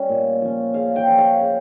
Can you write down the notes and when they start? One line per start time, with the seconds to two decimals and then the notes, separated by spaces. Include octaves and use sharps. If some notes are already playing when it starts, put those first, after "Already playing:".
Already playing: G3 C#4
0.09 A#2
0.41 F3 C#4
0.74 C#3 F5
0.96 G5
1.07 F3 C#4
1.18 F5
1.40 C#3